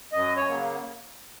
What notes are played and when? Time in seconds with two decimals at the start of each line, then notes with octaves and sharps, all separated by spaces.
0.13 F#2 D#5
0.37 C#5
0.48 C#3 F#3 A#3